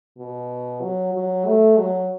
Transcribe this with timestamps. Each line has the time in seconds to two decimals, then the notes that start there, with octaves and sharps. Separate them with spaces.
0.18 B2
0.81 F#3
1.14 F#3
1.46 A3
1.78 F#3